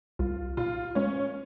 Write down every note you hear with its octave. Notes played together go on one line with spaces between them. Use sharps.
C2 F4
A#2 F4
G#3 C#4